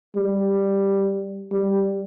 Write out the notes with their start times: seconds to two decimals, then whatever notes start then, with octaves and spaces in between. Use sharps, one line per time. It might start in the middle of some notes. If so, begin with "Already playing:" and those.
0.16 G3
1.52 G3